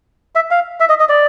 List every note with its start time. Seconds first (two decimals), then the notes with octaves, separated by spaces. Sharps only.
0.35 E5
0.51 F5
0.80 E5
0.89 D#5
1.00 D#5
1.09 D5